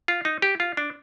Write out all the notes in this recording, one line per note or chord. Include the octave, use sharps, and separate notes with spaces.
F4
D#4
G4
F4
D4